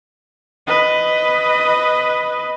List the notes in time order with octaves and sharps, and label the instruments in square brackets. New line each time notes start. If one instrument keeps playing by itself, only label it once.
[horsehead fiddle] B4 D#5